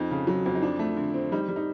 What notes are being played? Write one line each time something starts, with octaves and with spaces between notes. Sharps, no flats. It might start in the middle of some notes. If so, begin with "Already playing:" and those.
Already playing: F2 D#4
C#3
F#3
F2
D#4
F3 D4
A3
D3
C4
G3 D#4
G3
D#4